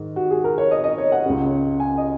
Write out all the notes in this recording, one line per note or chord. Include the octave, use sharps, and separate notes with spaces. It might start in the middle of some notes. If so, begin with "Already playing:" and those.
Already playing: G#2 D#3
F#4
G#4
A#4
C#5
D#5
D#5
C#5
F#5
C#2 C#3
G#5
D#5